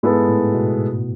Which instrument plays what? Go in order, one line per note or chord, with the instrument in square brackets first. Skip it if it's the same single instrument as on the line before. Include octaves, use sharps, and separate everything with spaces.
[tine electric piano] G#2 [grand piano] G#3 B3 E4 A4
[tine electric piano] A2
B2